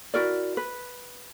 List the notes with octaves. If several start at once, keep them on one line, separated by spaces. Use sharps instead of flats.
E4 F#4 A#4 D5
B4